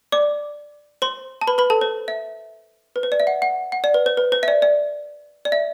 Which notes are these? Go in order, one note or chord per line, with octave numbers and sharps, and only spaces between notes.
D5 D6
C5 C6
A5
B4 B5
B4 B5
A4 A5
C5
E5
B4
C5
D5
E5
F#5
F#5
F#5
D5
B4
C5
B4
C5
E5
D5
D5
D5
E5